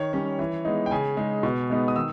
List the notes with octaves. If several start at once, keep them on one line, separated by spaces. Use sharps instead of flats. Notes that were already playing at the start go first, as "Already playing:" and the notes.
Already playing: D#3 C#5
G3 C#4
E3
G#3 B3 D#4
G5
C#3 G#5
G#3 D#4
B2
G#3 B3 D#4
D#6
D#3 E6